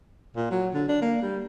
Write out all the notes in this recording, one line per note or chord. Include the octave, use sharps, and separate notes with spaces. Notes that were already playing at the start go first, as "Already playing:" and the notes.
A#2
F#3
D3
D4
A#3
G3